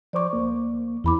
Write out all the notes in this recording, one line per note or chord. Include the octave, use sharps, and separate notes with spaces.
F3 C5 D5 C#6 D6
D2 A#3
E2 E4 B5 D6